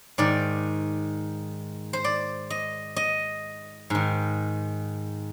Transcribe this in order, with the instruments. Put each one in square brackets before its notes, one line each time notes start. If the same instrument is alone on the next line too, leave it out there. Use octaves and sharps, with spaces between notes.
[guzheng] G#2 D#3 D5
C5
D5
D#5
D#5
G#2 D#3